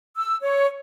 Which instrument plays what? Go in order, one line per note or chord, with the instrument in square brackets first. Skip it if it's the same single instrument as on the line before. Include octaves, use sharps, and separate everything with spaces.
[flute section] E6
C#5